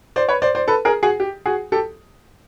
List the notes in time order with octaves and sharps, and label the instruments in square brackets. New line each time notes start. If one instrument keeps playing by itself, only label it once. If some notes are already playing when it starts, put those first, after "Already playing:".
[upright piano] C5 D5
B4 C#5
C5 D5
C5 D5
A4 B4
G#4 A#4
F#4 G#4
G4
F#4 G#4
G4 A4